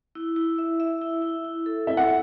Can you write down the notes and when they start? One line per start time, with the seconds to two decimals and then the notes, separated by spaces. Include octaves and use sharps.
0.15 E4
0.36 E4
0.58 E5
0.80 E5
1.02 E4
1.22 E4
1.44 E4
1.66 A4
1.87 E4 E5
1.97 F#5